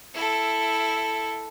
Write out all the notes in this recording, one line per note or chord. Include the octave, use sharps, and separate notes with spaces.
E4 A4